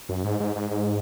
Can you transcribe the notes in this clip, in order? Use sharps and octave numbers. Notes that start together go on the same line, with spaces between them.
F#2
G#2
G#2
G#2
G#2